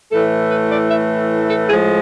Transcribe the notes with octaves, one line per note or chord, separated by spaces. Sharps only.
A2 E3 A3 A4
B4
D5
E5
A4
A2 F3 G#3 G#4